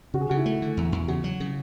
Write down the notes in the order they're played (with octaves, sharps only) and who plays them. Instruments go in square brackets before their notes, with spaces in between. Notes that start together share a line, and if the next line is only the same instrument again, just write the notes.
[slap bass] C#3 [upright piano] F#4
[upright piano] G#4
[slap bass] C#3 [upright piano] F#4
[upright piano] E4
[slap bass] A3
D3
E2
E2
[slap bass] C#3 [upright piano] F#4
[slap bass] F#3
C#3